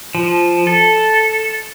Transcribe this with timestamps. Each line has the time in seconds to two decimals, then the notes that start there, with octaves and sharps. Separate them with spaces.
0.15 F3
0.67 A4